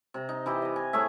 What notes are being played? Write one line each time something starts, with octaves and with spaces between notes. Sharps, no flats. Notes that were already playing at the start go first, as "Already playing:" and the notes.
C3 A#5
D#4
E3 E4 G4
D#5 A#5
G#5
A2 A3 G#4 E5